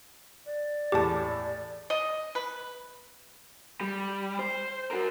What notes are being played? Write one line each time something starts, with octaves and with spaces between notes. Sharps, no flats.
D5
E2 A2 G4 A5
D#5
B4
G3
C5
F#4 A#4